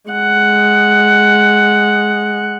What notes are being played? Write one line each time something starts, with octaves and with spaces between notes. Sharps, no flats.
G#3 F#5